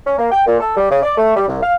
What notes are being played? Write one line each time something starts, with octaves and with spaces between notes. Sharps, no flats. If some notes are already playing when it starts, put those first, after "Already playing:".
C#4
A#3
G5
A#2
A4
G3
C#3
D5
A3
G3
C2
F5